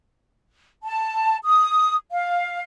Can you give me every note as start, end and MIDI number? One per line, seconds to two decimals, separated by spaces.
0.83 1.36 81
1.43 1.94 87
2.11 2.60 77